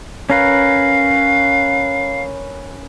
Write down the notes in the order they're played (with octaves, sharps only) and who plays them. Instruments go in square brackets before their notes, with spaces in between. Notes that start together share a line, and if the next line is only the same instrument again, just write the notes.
[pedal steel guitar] C#4 A#4 B4 [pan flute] F5